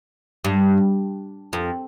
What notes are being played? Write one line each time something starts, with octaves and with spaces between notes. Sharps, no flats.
G2
F2